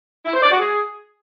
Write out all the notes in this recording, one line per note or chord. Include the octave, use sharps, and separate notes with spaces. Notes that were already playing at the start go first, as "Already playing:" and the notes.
E4
C5
D5
F#4
G#4